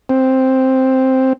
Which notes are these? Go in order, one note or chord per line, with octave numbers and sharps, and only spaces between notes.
C4